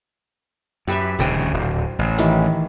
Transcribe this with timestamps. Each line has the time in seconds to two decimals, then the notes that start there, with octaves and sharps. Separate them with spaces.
0.87 F#2 G4 B4 E5
1.19 D#1 D2 C#3 C5 G5
1.53 D1
1.99 A1
2.18 D#3 E3 G4